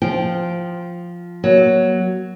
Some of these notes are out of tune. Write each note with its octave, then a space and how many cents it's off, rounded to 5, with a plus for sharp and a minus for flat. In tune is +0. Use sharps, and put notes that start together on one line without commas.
F3 +0 G5 -10
F#3 +5 A#3 +30